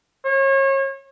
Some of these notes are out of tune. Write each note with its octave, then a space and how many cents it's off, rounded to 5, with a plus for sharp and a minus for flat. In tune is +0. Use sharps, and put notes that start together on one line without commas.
C#5 -35